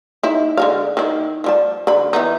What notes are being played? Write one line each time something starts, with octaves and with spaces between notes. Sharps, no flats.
D#4 E4
D3 G#3 F5
D#3 E4
F3 G3 A5
D3 B5
E3 B3 D#4